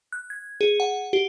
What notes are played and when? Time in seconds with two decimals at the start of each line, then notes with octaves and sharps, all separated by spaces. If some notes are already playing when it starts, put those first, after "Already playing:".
0.12 F#6
0.30 G#6
0.61 G#4
0.80 F#5
1.13 G4